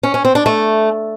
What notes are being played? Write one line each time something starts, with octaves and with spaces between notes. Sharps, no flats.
C#4
C#4
C4
D4
A3